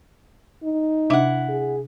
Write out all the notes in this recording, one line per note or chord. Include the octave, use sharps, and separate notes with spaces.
D#4
C3 D4 E4 F#5
G#4